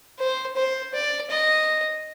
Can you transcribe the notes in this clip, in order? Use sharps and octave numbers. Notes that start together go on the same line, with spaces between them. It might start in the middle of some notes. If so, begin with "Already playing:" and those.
C5
C5
D5
D#5